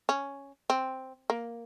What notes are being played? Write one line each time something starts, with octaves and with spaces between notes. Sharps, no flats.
C#4
C4
A#3